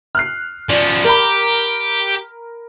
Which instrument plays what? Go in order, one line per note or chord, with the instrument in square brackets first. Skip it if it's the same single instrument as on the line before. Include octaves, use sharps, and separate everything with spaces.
[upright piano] F6 F#6 C7
[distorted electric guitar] F3 C#4 [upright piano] D5
[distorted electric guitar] G4 [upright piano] A#4 A#5 B5